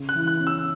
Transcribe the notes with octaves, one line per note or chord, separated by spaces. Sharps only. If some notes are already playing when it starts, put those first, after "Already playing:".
Already playing: C#3
F#6
E3
F#6
C#4
E6